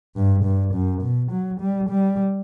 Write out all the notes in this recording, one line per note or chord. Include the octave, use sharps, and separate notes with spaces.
G2
G2
F#2
B2
F#3
G3
G3